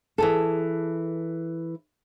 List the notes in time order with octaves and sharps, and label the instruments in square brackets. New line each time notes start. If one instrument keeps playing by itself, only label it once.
[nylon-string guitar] E3 G#4 A4